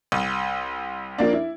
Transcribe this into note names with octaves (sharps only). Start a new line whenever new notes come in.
C2
F3 A#3 D4
E4